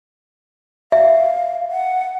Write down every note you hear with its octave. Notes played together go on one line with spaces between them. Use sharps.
E5 F5
F#5